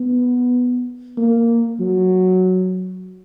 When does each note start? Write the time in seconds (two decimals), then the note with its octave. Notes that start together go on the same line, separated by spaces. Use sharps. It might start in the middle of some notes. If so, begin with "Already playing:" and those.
Already playing: B3
1.17 A#3
1.79 F#3